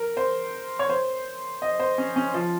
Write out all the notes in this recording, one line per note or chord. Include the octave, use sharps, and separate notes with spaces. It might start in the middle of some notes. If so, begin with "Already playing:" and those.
Already playing: A#4
C5
C#5
C5
D#5
C5
C#4
C#4
F3